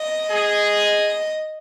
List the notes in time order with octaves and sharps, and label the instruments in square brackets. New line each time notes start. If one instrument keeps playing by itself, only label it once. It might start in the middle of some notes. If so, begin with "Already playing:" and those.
Already playing: [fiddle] D#5
[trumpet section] G#4